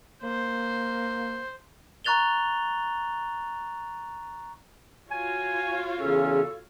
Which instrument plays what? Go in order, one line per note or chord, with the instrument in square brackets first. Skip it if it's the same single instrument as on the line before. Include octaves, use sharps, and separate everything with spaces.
[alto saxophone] A#3 [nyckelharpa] C5
[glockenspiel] A#5 C#6 F#6 A6 F7 G7
[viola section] F4 F#4 C#5 [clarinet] G#5
[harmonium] E2 C#3 C#4 [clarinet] A4